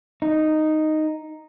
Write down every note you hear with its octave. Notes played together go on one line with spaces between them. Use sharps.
D#4